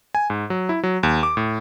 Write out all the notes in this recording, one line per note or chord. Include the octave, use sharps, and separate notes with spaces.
G#5
G#2
F#3
E4
F#3
D#2
D6
A2